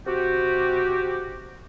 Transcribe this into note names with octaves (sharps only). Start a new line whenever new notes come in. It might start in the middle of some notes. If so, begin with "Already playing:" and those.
C3 F#4 G4